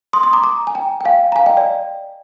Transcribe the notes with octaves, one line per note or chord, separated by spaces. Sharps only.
C6 D#6
C6 D#6
A#5 D6
A#5 D6
G#5
G5 A#5
G5
F5 G#5
A#5
F5 G#5
D#5 G5
D5